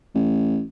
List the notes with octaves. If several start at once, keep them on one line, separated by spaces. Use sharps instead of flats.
A1